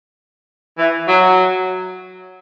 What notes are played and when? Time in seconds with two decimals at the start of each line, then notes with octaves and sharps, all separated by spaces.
0.79 E3
1.09 F#3